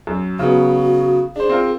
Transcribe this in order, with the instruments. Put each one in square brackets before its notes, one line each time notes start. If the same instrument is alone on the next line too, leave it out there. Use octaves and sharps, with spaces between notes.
[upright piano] F#2
[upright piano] C#3 F#3 B3 [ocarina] F#4
[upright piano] D4 C5 [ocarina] G#4
[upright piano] C4 F4 A#4